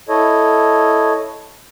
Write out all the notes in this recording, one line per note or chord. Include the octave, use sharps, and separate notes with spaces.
E4 A4 C#5 D#5